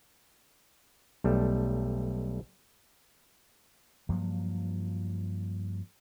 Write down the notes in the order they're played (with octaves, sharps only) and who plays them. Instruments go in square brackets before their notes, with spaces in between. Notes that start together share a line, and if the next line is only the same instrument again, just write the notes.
[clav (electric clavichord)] B1 G3 A3
[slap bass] G2 F3 F#3 A#3